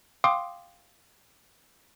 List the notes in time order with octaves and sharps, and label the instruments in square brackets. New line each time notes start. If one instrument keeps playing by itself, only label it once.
[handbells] F5 G5 C6 D6 D#6